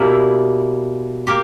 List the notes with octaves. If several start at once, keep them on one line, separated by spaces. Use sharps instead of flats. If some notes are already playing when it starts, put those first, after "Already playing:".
Already playing: B2 G3 A#3 E4
A#3 G4